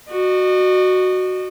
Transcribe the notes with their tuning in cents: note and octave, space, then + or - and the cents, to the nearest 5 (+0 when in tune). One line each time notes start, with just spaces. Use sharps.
F#4 +0 D#5 -40